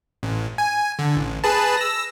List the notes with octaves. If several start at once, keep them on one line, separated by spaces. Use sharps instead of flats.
A1
G#5
D3
A1
G#4 B4 A5
E6 A#6